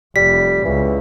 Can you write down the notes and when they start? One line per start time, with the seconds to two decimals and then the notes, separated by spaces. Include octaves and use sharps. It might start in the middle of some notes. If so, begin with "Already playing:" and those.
0.16 F1 G3 B6
0.65 C#2 E3